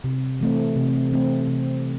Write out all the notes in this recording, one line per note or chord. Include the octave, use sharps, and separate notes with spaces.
C3
E3 A3 C4
C3
E3 A3 C4
C3